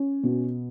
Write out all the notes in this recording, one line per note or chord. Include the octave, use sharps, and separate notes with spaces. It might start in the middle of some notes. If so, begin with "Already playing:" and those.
Already playing: C#4
B2